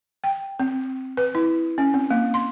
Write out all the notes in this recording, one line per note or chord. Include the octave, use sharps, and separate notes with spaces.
G5
C4
B4
E4
C#4
C4
A#3
C6